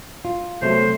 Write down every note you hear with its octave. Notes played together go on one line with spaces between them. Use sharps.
F4
C3 F#3 A3 B3 C5